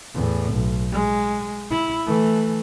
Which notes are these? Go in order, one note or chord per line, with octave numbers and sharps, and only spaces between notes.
E2 A2
B1
G#3
E4
E3 A3